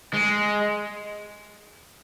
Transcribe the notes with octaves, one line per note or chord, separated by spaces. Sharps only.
G#3